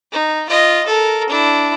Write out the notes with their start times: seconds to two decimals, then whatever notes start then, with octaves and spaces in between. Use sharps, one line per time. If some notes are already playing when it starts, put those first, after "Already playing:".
0.12 D#4
0.50 F4 D#5
0.86 A4 A#4
1.30 D4 E4